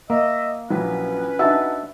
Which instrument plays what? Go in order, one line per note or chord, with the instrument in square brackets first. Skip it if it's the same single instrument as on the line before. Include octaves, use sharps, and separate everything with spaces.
[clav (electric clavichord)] A#3 [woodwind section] D#5 E5
[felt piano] A#1 E3 F#3 [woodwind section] C#4 B4
[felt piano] D4 D#4 F#4 [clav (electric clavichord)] E5 A5